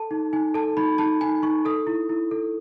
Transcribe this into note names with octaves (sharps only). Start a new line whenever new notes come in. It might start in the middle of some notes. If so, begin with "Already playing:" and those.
Already playing: A4 A5
D#4
D#4 G#5
A4 A5
D#4 B5
D#4 A5
D#4 G#5
D#4 C#6
A4 D#6
E4
E4
A4